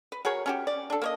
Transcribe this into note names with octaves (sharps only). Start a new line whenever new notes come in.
B4
F#4 G#4 A#4 C#5
C#4 F#4 G4
D5
D4 A4
A#3 C#5 D#5